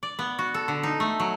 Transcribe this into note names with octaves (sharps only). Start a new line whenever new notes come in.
D5
B3
F#4
A4
D3
D#4
A3
F#3